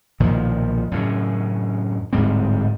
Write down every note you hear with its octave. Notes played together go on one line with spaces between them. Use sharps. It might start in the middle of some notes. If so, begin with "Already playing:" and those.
B1 A#2 D#3 F3
F#2 A2 C#3
D1 G#2 G3 C4